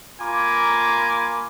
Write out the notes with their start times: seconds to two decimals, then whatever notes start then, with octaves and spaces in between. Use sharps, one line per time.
0.21 A#3 F4 G#5 A#5 B5 D6